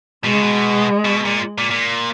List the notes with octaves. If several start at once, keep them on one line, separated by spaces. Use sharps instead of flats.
B2 G#3
C#3
B2
B2
A#2
A#2
A#2